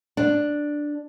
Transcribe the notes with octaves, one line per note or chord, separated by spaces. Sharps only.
D4